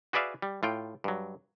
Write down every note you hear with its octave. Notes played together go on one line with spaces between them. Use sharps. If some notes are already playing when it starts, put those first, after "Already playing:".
F#4 G#4 B4 D5 E5 F5
G3
A2 F4 G5
G2 F#3